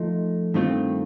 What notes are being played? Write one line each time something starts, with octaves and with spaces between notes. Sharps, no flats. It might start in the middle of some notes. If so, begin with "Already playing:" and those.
Already playing: F3 A3 D#4
G2 D#3 A3 C4 F4